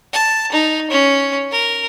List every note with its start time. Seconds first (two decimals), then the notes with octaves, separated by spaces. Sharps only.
0.13 A5
0.53 D#4
0.90 C#4
1.51 A#4